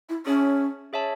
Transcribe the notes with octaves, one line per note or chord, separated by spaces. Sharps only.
E4
C#4 G#4 C#5 E5 A5
G#4 C#5 E5 A5